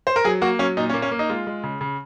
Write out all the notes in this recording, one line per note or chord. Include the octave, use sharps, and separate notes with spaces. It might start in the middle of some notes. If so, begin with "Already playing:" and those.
C5
A#4
F#3 G#4
A#3 F#4
F#3 C#4
A#2 D#4
C#4
A#3
C#4
A#3
D#4
G#3 F4
G#3
C#3
C#3